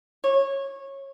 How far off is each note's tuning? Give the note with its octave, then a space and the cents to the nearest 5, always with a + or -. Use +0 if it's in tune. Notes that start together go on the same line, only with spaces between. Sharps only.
C#5 -20